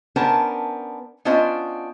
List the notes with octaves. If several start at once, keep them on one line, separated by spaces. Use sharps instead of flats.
B3 C#4 D4 A#4 C5 A5
B3 C#4 D4 F4 C5 D#5